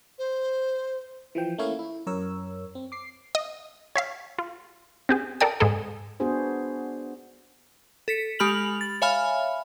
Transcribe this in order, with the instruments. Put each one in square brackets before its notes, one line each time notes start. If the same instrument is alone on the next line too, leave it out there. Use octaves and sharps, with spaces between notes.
[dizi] C5
[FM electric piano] E3 F3 G5
A3 A#3 C#4 E4 C#5 F5
E4
F#2 A#4 C#5 E6
C4
D6 C7
[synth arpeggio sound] D#5
C#5 E5 F5
F4
C4 G4 G#4
A4 A#4 D5 G5 D#6
G#2 G#3 G#4 A4
[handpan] B3 D4 F#4 G#4 C5
[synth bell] A4 B6 C#7
G#3 G4 B5 F6 F7 F#7
A6
C#5 E5 F5 G#5 B5 F6